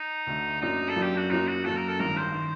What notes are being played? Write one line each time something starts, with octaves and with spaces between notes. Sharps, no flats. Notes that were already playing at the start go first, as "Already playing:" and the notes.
Already playing: D#4
D2 D3 A3
F#2 F#3 A#3 D4 D#4
A4
F#2 F#3 A#3 D4
G4
F#4
F#2 F#3 A#3 D#4
F#4
F#2 F#3 A#3 A4
A#4
A4
A1 G2 D#3 A#4
C5
D#3